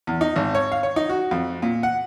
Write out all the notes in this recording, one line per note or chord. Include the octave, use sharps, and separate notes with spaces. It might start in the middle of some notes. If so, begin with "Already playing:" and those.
E2
D#4
G#1
C#5
F5
C#5
D#4
F#4
F2
A#2
F#5